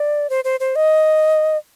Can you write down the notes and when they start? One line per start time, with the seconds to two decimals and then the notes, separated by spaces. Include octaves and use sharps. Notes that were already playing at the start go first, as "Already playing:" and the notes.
Already playing: D5
0.30 C5
0.44 C5
0.60 C5
0.76 D#5